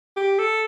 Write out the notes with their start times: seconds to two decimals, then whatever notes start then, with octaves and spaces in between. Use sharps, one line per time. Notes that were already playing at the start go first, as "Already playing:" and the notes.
0.17 G4
0.39 A4